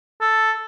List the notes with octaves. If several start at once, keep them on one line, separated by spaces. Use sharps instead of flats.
A4